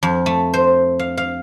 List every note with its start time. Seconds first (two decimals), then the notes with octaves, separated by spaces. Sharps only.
0.03 F2
0.26 A3
0.54 C5
0.99 F5
1.17 F5